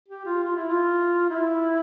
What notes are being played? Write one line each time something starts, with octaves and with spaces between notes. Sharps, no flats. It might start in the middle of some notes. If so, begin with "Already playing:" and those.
G4
F4
F4
E4
F4
E4